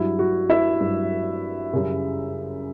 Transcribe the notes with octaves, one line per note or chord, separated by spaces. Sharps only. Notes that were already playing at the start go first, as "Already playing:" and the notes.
Already playing: G2 F#3 E4
F#4
E4 E5
G2 F#3
F#2 C#3 G3